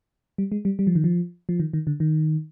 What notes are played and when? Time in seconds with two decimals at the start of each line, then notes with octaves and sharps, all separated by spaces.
0.38 G3
0.52 G#3
0.65 G3
0.79 G3
0.87 F3
0.95 D#3
1.04 F3
1.49 F3
1.60 D#3
1.73 D#3
1.87 D3
2.00 D#3